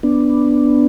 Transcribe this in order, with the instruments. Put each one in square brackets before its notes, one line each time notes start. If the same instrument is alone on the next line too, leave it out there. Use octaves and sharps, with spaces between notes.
[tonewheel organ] B3 D4